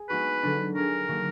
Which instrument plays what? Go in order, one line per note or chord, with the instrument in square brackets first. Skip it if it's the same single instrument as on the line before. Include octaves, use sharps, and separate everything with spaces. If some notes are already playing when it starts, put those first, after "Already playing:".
Already playing: [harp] G#4
[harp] G#3 B3 D#4 F#4 [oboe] B4
[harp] D3 F#3 D4
[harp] F#3 D4 G#4 [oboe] A#4
[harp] D#3 F#3 A#3 D4